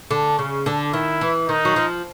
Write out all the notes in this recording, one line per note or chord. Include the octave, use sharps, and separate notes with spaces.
D3
C#3
D3
D#3 E4
E3
D#3 D#4
F#3
F3